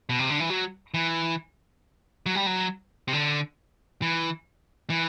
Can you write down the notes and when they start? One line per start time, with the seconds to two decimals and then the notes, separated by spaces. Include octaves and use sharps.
0.09 B2
0.19 C3
0.30 D3
0.40 E3
0.50 F#3
0.94 E3
2.26 F#3
2.35 G3
2.46 F#3
3.08 C3
3.13 D3
4.02 E3
4.90 E3